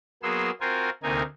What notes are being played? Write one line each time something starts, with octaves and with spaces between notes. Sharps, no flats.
F#3 A#3 B3 G#4 C6 E6
C4 F4 F#4 A#4 C5 G#5
D2 C3 A#3 D#4 A#4 G#5